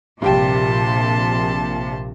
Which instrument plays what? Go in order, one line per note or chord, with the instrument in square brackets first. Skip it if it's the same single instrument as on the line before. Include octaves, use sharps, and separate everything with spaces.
[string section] A#1 C3 [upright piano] G2 G4 G5 [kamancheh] A5 C6